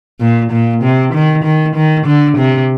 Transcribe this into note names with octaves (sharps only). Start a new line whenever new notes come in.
A#2
A#2
C3
D#3
D#3
D#3
D3
C3